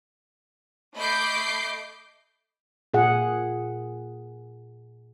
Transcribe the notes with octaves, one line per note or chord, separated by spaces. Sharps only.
A3 D#5 B5 D6 G6 C7
A#2 G#4 F#5